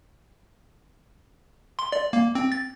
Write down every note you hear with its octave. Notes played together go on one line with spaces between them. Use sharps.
C6
D5
A#3
C4
A6